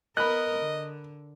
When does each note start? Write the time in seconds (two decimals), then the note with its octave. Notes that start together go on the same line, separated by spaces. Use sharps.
0.17 B3 A#4 D#5 B5 F#6
0.59 D3